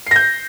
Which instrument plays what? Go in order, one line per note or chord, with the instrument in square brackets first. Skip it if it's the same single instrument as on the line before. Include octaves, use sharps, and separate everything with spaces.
[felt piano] C7
A#6
G6